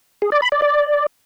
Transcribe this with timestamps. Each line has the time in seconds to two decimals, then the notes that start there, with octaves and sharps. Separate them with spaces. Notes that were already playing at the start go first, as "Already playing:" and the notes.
0.22 G#4
0.32 D5
0.42 B5
0.52 D5
0.62 D5